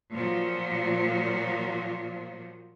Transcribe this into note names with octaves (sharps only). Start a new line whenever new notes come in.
A#2 F3 F#3